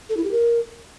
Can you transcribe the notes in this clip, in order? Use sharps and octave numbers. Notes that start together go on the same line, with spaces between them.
A4
E4
G4
A#4